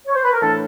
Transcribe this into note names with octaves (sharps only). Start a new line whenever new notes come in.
C#5
C5
B4
A#4
A2 E3 A3 D4 A4